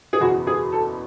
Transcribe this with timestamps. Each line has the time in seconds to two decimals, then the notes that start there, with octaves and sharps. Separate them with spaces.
0.13 G#4
0.20 F#1 E2 B2 F#4
0.47 G#4
0.72 A4